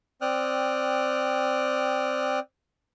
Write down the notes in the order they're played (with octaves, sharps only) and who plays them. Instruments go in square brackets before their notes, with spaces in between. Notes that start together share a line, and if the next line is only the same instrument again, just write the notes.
[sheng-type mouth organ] C4 D5 G5 D#6 F6 F#6